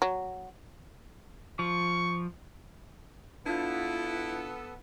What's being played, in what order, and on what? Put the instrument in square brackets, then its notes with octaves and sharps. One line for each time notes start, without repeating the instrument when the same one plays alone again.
[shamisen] F#3
[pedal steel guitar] F3 [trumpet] C#6
[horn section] B3 A4 [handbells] D4 [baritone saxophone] E4 [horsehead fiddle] F4